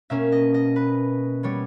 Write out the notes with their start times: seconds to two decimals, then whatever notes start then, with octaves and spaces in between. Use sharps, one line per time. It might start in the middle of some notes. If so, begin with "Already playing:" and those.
0.10 B2 A#3 C#4 E5
0.32 D#5
0.54 D#5
0.76 B4
1.43 G3 B3 C#5